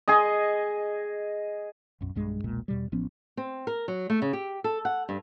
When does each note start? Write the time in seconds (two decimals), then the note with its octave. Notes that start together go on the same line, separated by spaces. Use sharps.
0.08 G#4 D#5
2.01 B1 F#2
2.15 B1 G2 G#3
2.44 E1 B1 A#2 G#3
2.68 E2 B2 G3
2.92 A1 F3 B3 C#4
3.37 C4
3.67 A#4
3.88 F#3
4.10 A3
4.22 C#3
4.33 G4
4.64 A4
4.85 F#5
5.09 G2